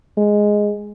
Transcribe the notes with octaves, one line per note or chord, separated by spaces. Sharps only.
G#3